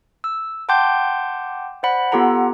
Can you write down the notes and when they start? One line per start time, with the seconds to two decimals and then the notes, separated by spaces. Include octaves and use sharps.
0.24 E6
0.69 F#5 G5 A5 C6 D6 G6
1.83 C5 D5 F#5 B5
2.12 B3 F4 G4 A4 F#5 A#5